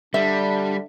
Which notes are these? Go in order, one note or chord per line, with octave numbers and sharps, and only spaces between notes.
D3 G3 D4 E5